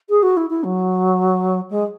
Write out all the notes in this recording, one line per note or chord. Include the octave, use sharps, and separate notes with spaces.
G#4
F#4
E4
E4
F#3
G#3